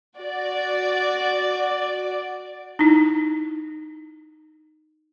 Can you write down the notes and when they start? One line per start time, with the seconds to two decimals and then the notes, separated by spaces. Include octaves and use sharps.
0.19 F#4 D5
2.79 D#4 E4